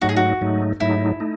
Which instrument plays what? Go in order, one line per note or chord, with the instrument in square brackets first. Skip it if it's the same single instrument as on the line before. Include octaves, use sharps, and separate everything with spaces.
[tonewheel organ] G#2 F#3 A3 D#4 [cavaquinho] F#4
[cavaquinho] G#4
F#4
[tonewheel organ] G#2 F#3 A3 D#4
[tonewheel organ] G#2 F#3 A3 D#4 [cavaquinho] E4
[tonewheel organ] A3 D#4